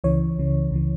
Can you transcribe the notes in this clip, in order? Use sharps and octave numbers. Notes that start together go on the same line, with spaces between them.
C#2 C#3 E3 C#5
C#2 C#3 E3
C#2 C#3 E3